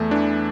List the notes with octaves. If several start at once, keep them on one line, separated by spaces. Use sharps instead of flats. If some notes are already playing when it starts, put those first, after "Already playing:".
Already playing: E2 A3
E3 D4